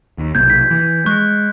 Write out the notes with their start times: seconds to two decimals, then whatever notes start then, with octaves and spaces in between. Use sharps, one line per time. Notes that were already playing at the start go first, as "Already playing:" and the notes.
0.18 D#2
0.35 B1 C3 A#3 G6 G#6
0.50 B6
0.71 E3
1.06 G#3 C#6 F#6